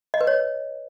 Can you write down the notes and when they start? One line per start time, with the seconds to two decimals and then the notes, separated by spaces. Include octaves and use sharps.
0.14 D#5
0.21 B4
0.27 C#5